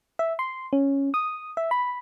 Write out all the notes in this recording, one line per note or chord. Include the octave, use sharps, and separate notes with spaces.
E5
C6
C#4
D#6
E5
B5